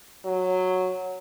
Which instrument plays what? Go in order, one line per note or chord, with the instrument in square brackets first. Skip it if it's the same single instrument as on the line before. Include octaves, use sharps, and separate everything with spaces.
[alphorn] F#3